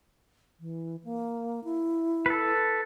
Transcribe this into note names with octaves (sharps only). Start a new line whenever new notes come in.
E3
A#3
E4
A4 B4